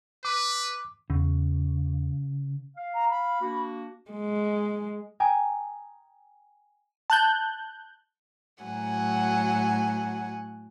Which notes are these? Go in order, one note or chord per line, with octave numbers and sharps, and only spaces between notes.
B4 D6
E2 C#3
F5
A#5
B5
A#3 D4 F#4
G#3
G5 G#5 A#5 D#6
A5 F#6 G6
A2 F#3 F#5 G#5